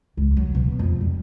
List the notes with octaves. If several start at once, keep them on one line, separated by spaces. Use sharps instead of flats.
C#2
F#3
B2
F2
G3